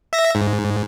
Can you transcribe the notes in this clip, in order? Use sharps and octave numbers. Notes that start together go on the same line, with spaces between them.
E5 A#6
G#2